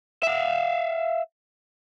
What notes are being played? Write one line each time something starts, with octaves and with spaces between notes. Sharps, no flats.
E5 F5